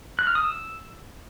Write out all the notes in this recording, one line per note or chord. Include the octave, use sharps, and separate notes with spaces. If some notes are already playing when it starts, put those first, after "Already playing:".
F#6
F6
D#6
E6